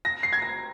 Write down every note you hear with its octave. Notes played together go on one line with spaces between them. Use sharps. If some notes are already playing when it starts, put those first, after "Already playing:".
A#6
C7
G#6
A#6